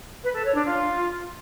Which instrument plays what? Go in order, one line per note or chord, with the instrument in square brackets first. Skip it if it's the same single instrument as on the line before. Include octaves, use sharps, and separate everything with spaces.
[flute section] B4
A4
C#5
D4
F4